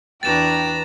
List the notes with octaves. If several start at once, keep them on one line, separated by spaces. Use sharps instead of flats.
E2 D4 F#4 B4 G5 A#5 A6 E7